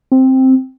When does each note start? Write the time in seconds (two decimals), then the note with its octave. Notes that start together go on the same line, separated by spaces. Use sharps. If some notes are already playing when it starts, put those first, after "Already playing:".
0.11 C4